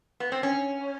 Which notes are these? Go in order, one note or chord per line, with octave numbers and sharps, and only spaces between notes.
B3
C4
C#4